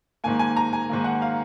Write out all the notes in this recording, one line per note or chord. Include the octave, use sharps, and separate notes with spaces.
G#2 D#3 A#3 G#5
G#5
A#5
G#5
G#2 D#3 A#3
F#5
F5